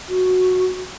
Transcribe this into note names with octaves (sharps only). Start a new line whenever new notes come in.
F#4